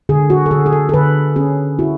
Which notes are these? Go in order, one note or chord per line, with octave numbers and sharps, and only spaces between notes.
D3 G#4
F#4
A4
D3 G#4
G#4
A4
A4
D3 B4
C#4 G#4
E4 F#4